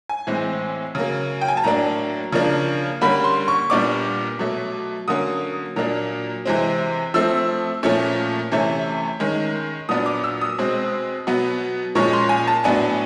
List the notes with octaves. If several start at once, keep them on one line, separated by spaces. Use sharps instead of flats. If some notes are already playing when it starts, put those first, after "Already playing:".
G#5
A2 E3 G#3 C4
C#3 F#3 A#3
G5
G#5
A5
A2 F#3 A#3 D4 A#5
C#3 F3 A#3 D4
D3 G3 A#3 C#4 B5
C6
C#6
A#2 G3 B3 D4 D6
B2 F#3 A3
D3 F#3 A#3 C#4 D#6
A#2 F#3 A#3 D4
C3 E3 G#3 C4
F3 A3 C4 E6
A#2 F3 A3 C#4
C3 E3 A3 C#4
D#3 G#3 C#4
A#2 F#3 B3 D4 D#6
D6
E6
D#6
B2 G#3 C4
B2 F#3 B3
A#2 F3 G#3 C#4 C#6
C6
G#5
A5
A2 F#3 B3 D4 G#5